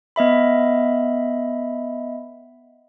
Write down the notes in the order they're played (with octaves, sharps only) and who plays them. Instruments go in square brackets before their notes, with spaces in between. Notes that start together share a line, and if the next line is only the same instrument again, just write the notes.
[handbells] B3 D#5 E5 B5